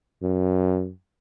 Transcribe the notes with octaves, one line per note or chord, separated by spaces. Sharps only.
F#2